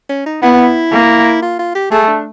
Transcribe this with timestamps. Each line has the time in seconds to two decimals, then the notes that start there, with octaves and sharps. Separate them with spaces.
0.09 C#4
0.26 D#4
0.42 B3 E4
0.92 A#3
1.42 F4
1.59 F4
1.75 G4
1.91 A3 G#4
2.08 D4